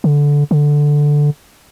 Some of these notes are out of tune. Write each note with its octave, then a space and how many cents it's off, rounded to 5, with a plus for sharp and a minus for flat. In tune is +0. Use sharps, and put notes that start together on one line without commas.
D3 -15
D3 +0